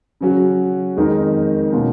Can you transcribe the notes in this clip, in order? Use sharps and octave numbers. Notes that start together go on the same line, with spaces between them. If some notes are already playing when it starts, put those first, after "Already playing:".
C#3 F#3 C#4 F#4
F2 D#3 G#3 D#4 A#4
B2 A#3 C#4 F4